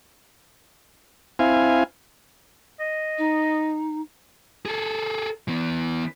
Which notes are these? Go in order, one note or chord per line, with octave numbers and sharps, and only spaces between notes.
C4 E4 F5 G#5
D#5
D#4
G#4 A4
E3 B3